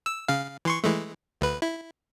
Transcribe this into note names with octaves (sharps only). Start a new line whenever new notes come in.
E6
C#3 F5
E3 C6 C#6
E3 G#3 A3
D2 B4
E4